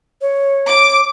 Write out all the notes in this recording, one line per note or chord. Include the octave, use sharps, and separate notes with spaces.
C#5
D6